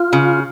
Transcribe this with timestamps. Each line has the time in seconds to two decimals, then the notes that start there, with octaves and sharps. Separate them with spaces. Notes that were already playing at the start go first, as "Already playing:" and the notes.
Already playing: F4
0.13 C#3